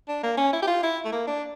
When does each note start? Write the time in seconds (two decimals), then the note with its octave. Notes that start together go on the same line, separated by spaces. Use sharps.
0.08 D4
0.23 A#3
0.37 C#4
0.53 E4
0.62 G4
0.67 F4
0.83 E4
1.05 A3
1.12 A#3
1.27 D4